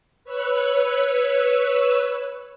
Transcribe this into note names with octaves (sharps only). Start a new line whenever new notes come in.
B4 C#5 E6 F#6